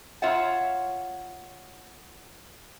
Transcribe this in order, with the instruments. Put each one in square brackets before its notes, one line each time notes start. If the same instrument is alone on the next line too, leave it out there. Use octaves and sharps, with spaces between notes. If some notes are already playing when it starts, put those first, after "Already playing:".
[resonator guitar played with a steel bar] F4 C#5 E5 F#5